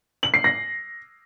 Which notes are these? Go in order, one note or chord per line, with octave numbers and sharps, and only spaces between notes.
F#7
C7
A#6